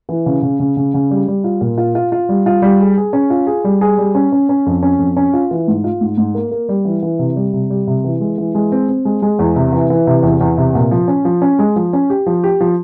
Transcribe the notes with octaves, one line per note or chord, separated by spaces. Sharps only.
E3
C#3
C#3
C#3
C#3
C#3
G3
G3
F4
A#2
F4
F4
F4
G3
F4
G3
G#4
G#4
C#4
F4
G#4
G3
G#4
G3
C#4
C#4
C#4
F2
C#4
F2
C#4
F4
E3
G#2
F4
G#2
G#2
A#3
A#3
G3
E3
E3
C3
G3
C3
G3
C3
E3
G#3
E3
G#3
C4
C4
G#3
G#3
E2
C3
E3
E3
C3
E2
E2
C3
A#2
F3
C#4
F3
C#4
G#3
F3
C#4
G4
F3
G4
F3